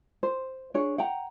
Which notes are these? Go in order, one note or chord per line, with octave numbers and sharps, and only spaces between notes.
C5
D4 G#4 C#5
F#5 G5 A#5